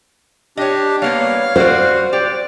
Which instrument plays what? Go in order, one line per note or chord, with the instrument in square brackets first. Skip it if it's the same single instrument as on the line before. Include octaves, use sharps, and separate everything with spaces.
[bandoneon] D4 G4 [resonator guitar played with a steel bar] C#5 D#5
[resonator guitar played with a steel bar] G3 A#3 B3 [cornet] C#5 [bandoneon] F5
[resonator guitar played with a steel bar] G3 D5 [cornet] F#4 [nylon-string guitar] C5
[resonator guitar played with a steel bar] G4 [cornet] D5